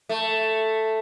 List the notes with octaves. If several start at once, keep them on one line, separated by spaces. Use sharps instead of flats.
A3